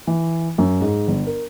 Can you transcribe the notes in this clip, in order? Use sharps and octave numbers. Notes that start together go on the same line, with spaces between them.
E3
F#2
G#2
G1
A#4